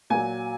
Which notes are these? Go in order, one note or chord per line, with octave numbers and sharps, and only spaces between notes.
A#2 F#3 G#5